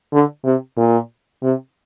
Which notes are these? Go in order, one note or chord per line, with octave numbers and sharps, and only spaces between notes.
D3
C3
A#2
C3